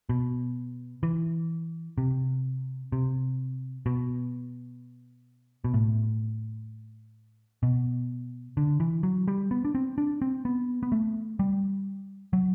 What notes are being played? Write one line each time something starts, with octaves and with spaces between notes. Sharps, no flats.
B2
E3
C3
C3
B2
B2
A2
B2
D3
E3
F#3
G3
B3
D4
C4
D4
C4
B3
B3
A3
G3
F#3